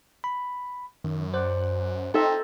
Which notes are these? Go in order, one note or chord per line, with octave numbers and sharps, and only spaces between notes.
B5
F#2 D#3
C5 D5 F#5
C4 D#4 F4 A4 E5 A#5